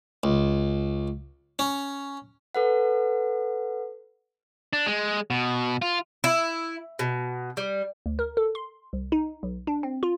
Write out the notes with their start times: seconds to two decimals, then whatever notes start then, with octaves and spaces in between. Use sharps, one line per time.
0.24 C#2
1.59 C#4
2.55 A4 B4 F#5
4.73 D4
4.86 G#3
5.30 B2
5.82 F4
6.24 E4
6.99 B2
7.57 G3
8.06 D2
8.19 A#4
8.37 A4
8.55 C6
8.93 C2
9.12 D#4
9.43 B1
9.67 D4
9.83 C4
10.03 F4